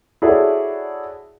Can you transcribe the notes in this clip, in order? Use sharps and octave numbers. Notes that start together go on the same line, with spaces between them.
E4 F#4 G#4 A4 C#5 D5